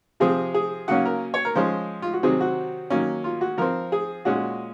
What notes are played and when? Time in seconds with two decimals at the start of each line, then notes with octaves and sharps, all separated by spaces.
0.20 C3 F3 C4 G#4
0.54 G#4
0.88 C#3 F#3 A#3 C#4 F#5
1.05 A#4
1.34 C#5
1.45 A#4
1.55 F3 G#3 C#4 C5
2.02 F4
2.13 F#4
2.23 C3 D#3 F#3 C4 G#4
2.41 F#4
2.90 D#3 F#3 A#3 C#4
3.24 F4
3.41 F#4
3.58 F3 C4 A#4
3.92 G#4
4.25 A#2 G#3 C#4 F#4